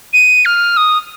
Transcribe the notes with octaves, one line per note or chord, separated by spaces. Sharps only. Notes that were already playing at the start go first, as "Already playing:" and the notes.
D#7
F6
D#6